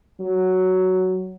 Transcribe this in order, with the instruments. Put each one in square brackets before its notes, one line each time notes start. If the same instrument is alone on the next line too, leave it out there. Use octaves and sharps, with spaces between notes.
[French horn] F#3